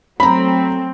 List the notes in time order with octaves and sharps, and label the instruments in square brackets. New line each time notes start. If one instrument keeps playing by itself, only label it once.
[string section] F#3 A3 C4 [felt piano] A#5 B5